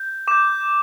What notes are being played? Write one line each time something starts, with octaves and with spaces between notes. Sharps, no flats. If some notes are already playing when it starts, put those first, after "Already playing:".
Already playing: G6
D6 G6 E7